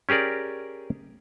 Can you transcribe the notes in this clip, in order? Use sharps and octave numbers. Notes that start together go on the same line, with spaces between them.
C#4 G4 G#4 A#4 D5